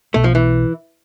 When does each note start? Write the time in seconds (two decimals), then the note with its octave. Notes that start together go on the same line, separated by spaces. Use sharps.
0.14 B1 B2 A3 B3
0.24 F3
0.35 E3